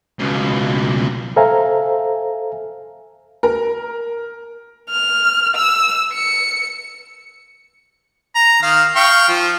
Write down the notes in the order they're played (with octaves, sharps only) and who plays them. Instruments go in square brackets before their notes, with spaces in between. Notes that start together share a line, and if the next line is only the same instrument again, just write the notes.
[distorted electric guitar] C#2 B2
[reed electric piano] A4 C5 E5 F5 G#5 A#5
[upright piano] A#4
[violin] F6
E6
C#7
[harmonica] A#5
D#3 F5
F5 G5 C#6
F3